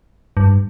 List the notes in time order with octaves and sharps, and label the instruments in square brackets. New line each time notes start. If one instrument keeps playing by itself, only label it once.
[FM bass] G2